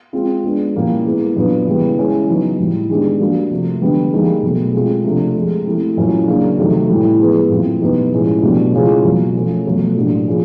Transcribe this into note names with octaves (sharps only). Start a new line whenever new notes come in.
G#3 C4 F4
G#3 B3 D4
A#2 G3 A#3 C#4 E4
G#3 B3 E4 G#4
A#2 F#3 B3 D4
C#3 E3 G3 B3
E3 G#3 C#4
C#3 F#3 B3 D#4
A2 E3 G3
D#3 G#3 B3 D4 G4
G3 A#3 D4 F#4
C3 F3 A3
D3 G3 B3
G3 A#3 D#4 G#4
B2 F#3 A3
G#3 C4 F4 G#4
C3 F3 A3 D4
C3 F3 G#3
E3 A3 C4 E4 G4
A#2 F#3 A#3 C#4 E4
C#3 F#3 A#3 D4
C3 D#3 F#3 A3
A2 E3 G3
F3 G#3 B3 E4 G#4
A#2 F#3 A3 C4 E4
B2 F#3 B3 D#4 G4
A2 F3 G#3 C#4 E4
B2 F#3 A3 D4 G4
C#3 E3 G#3 C#4 F4
B2 F#3 A#3
F3 A3 C#4 F4
B2 F#3 A3
A2 F#3 A#3 D4 G4
F3 A#3 C#4 F4 G#4